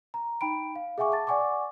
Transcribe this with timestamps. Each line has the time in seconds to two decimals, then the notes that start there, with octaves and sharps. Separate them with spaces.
0.14 A#5
0.41 D#4 G5 B5 D7
0.76 F5
0.98 G#4 E5 F#5 G#5 C#6 D6
1.12 A5 A6
1.27 D5 F#5 G#5 C#6 D6